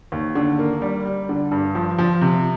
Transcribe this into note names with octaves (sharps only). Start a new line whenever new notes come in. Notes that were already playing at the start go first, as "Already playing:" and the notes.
D#2
D3
A#3
G3
G3
D3
G2
F3
F3
C3